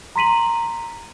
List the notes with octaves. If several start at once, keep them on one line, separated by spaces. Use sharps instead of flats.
A#5 C6 B6 D#7 F#7